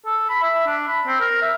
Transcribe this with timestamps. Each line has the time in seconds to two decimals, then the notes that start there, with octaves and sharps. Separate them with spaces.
0.05 A4
0.29 B5
0.42 E5
0.66 D4
0.88 B5
1.06 C4
1.20 A#4
1.41 E5